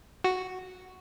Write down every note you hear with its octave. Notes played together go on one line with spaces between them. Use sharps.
F#4